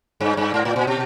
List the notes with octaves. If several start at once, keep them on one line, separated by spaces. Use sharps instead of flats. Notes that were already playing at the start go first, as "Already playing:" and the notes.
G2
G2
G#2
A2
A#2
B2